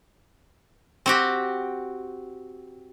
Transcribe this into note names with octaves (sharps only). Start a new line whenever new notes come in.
C4 F#4 G4